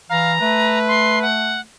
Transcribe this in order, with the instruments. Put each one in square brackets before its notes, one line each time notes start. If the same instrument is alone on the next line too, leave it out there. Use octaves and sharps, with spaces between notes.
[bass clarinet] E3 [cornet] F5 [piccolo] A#5
[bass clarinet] A3 [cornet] B4
[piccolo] C6
F#5